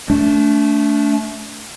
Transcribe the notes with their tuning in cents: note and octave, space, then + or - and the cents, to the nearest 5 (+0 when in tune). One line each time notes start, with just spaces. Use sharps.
A3 +0 D4 -35